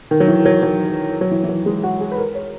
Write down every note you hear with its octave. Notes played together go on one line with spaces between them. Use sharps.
D#3
F#3
E3
F#3
F#3
F#3
E3
E3
F#3
G#3
F#4
G#4
B4
A#4
C#5